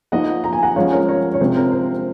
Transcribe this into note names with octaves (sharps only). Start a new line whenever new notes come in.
F3 A#3 D#4 D#5 F#5
A#5
G#5
F#5 A#5
F3 G#3 C#4 C#5 F5
A#4 C#5
A#4 C#5
C#5
C3 F3 G#3 C4 C5
A#4
C5